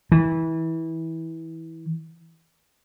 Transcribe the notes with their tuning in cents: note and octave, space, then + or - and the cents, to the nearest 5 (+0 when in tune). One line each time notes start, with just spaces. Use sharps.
E3 -20